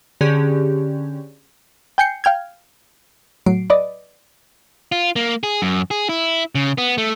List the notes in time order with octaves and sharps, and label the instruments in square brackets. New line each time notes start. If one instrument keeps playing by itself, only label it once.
[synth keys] D3 C#4 G4 G#4
[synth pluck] G5 G#5 G6 C7 C#7
F5 G5 F6 G#6
A2 F#3 C7 D7
B4 D5 D#5
[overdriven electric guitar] F4
A#3
G#4
F#2
G#4
E4
C#3
B3
A3